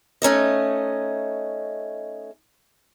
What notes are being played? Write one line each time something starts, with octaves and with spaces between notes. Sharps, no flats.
A3 C#4 D#4 D#5